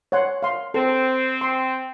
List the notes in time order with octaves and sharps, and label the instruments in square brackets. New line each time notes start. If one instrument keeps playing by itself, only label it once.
[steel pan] C#5 F#5 C6
F5 C6
[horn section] C4 [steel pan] A4
[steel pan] C6